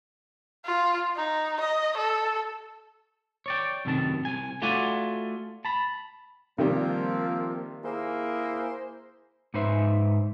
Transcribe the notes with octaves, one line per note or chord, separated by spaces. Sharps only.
F4
D#4
D#5
A4
C#5 D5 G5
F#2 A2 C3 D#3 A5
C2 G#5
A3 F4 F#4 D5 G#5
A5 B5
C3 D#3 F3 G3 A#3 C4 F4
A#3 E4 G#4 C5
G#2 D#4 B4 C5 E5